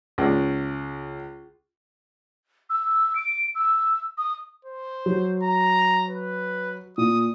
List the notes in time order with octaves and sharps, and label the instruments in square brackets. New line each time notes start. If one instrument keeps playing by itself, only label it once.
[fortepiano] C#2
[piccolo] E6
D7
E6
D#6
[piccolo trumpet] C5
[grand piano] F#3
[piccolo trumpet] A#5
B4
[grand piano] A#2 [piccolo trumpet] D#6